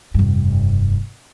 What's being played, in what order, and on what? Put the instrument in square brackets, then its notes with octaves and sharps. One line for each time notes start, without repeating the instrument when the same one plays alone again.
[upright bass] F1 G2